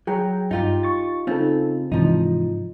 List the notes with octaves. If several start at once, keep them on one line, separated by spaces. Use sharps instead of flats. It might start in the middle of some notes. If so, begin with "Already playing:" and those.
F#3 G#4 G5 A#5
G2 D#4 F4 G4
C#6 A6
C#3 C4 D#4 F4 A4
G#2 C3 E3 F3 D#4